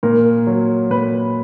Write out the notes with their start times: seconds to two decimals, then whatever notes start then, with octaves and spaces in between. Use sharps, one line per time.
0.03 A#2 A#4
0.47 F#3
0.90 A#2 B4